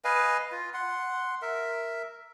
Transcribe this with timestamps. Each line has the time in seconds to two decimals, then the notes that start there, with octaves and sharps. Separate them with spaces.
0.04 B4 D#5 F5 G#5
0.52 F4
0.74 F#5 C6
1.42 A#4 E5